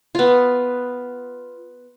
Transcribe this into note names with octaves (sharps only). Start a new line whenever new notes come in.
B3 F4